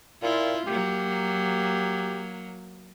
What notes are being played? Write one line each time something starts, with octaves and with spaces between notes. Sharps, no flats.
A#2 E4 F4
F#3 A#3 G4